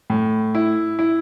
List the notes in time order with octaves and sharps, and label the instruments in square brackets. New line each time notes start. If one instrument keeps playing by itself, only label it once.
[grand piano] A2
E4
E4